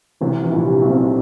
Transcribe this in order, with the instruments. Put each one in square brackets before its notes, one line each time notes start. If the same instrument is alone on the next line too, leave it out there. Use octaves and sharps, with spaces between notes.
[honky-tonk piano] C2 C3 [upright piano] E3
[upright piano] E3
[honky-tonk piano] A#1 A#2
[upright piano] G3
[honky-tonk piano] B1 B2
[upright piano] C4